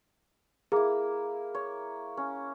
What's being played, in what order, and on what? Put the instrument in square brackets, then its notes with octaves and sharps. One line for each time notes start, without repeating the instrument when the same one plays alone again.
[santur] A#3 E4 [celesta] G#4
[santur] C#5
C#4